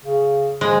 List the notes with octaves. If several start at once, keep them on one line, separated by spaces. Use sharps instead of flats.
C#3
F3 G#3